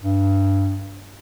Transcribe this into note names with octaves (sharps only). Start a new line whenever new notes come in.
G2